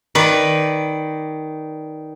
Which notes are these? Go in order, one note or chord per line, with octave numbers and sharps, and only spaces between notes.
D#3 B4 D5